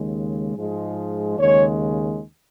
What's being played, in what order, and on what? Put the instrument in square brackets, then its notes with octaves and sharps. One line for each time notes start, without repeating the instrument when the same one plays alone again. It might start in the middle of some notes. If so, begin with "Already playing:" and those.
Already playing: [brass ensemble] D#2 C#3 G#3
G#2 F3 G#3
D#2 C#3 G#3 C#5